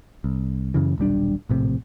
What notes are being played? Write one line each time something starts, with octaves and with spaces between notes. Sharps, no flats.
C2
F#2 C#3 E3
D#1 B1 G3 D4
A#1 A2 C3